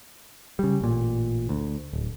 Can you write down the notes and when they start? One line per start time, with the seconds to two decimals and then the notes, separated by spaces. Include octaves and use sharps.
0.59 C#3 G3
0.81 A1 A#2
1.49 D2
1.93 D1